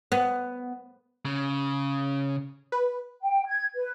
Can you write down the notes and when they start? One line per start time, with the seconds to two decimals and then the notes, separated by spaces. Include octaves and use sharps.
0.12 B3
1.25 C#3
2.72 B4
3.22 G5
3.47 G#6
3.76 B4